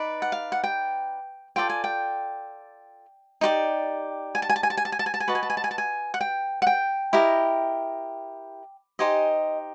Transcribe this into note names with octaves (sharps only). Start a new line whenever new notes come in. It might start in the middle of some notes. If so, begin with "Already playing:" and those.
Already playing: D#4 B4 D5
F#5
F5
F#5
G5
F4 A4 D5 G5
G#5
G5
D#4 G4 B4 D5
G#5
A5
G#5
A5
G#5
A5
G#5
A5
G#5
A5
G#5
A5
G#5
F#4 B4 D#5 A5
G#5
A5
G#5
A5
G#5
A5
G#5
F#5
G5
F#5
G5
E4 G4 A#4 D#5
D#4 G4 C5 D#5 G#5